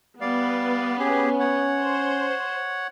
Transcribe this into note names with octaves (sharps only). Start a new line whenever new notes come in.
G3 B3 D5 F5
C#4 G4 G#4
C#5 F#5
C5